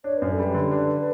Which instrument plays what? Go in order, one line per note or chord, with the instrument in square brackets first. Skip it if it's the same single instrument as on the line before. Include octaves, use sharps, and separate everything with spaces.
[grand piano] D4 [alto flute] C#5
[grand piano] F#2 [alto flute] B4
[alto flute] A4
[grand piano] G3
[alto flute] B4
[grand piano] D3
D4